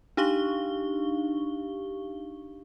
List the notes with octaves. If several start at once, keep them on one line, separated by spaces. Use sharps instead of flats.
D4 D#4 G4 F5 C#6 G7